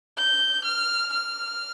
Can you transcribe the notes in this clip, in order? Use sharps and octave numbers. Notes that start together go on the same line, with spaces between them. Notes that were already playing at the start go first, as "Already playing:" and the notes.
G6
F6
F6